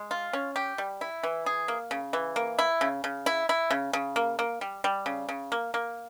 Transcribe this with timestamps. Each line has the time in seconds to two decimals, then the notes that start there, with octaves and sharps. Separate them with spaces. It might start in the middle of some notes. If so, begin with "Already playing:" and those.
Already playing: G#3
0.11 F4
0.33 C#4
0.56 G4
0.78 G3
1.01 E4
1.23 E3
1.46 G#4
1.68 A#3
1.91 C#3
2.13 E3
2.36 A#3
2.59 E4
2.81 C#3
3.04 C#3
3.26 E4
3.49 E4
3.71 C#3
3.93 C#3
4.16 A#3
4.39 A#3
4.61 G3
4.84 G3
5.06 C#3
5.29 C#3
5.52 A#3
5.74 A#3